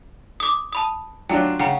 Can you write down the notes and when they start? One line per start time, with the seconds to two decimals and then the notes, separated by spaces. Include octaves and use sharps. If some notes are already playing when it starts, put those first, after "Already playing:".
0.40 D6 D#6
0.73 A5 B5 D#6
1.29 F#3 D4 F4 G5
1.59 C#3 F#5 G5 A#5